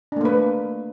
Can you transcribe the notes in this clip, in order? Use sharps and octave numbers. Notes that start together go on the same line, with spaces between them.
A3 A#3 D4 B4